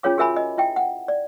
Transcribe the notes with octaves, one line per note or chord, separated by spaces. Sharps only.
C#4 F4 G#4 C#5 F5 D6
F#4 G#4 A#4 E5 G#5 B5
D#5
E4 E5 G5
F#5
D5